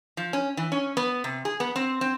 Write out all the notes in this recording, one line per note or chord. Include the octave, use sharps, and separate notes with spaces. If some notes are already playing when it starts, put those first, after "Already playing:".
F3
C#4
E3
C#4
B3
C3
G#4
B3
C4
C4